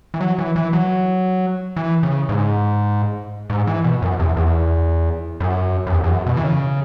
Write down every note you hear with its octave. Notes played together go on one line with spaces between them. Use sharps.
E3
F#3
E3
E3
F#3
E3
C#3
G#2
G#2
E3
B2
F#2
E2
E2
F#2
F#2
E2
E2
F#2
B2
E3
C#3